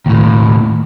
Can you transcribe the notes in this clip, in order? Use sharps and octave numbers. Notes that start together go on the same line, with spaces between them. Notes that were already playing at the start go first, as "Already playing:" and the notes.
D#2 A2